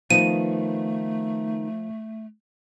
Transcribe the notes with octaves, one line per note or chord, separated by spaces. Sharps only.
D#3 F3 A3 B3 D#4 D#7